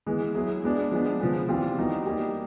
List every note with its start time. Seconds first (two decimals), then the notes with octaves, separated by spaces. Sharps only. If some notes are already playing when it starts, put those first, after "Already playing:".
0.06 E3 G#3 B3
0.35 F#3 B3 E4 G#4
0.64 G#3 B3 D4
0.91 F3 G#3 B3 D4
1.20 C#3 F3 G#3 B3
1.49 E3 G3 C4 F4
1.77 E3 G3 B3 D#4 F#4
2.06 G3 A#3 D#4